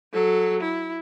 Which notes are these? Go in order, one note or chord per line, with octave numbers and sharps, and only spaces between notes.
F#3 A4
E4